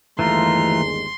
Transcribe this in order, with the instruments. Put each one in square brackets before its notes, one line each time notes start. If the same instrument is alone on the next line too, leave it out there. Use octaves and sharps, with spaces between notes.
[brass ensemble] G1 D#2 G#3 [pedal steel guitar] E3 A3 F4 [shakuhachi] A#5 [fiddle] C6